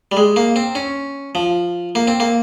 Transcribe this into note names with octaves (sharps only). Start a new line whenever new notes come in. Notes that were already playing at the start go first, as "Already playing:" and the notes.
G3
G#3
A#3
C4
C#4
F3
A#3
C4
A#3